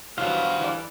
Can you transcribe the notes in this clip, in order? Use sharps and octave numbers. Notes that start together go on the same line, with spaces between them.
G2 E3 F#3 B3 F#4 C5 F5
E3 D5